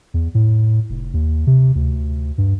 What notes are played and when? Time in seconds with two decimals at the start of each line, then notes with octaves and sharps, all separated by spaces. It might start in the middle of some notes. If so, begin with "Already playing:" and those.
0.14 E2
0.35 A2
0.90 F1
1.14 D#2
1.47 C3
1.75 D2
2.38 G2